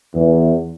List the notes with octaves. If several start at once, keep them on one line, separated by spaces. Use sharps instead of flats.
E2